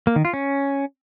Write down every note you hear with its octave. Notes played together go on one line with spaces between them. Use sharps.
A#3
D#3
F4
C#4